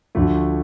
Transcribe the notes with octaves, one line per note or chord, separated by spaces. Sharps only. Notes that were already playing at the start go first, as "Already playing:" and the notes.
D2 D3 F3 A3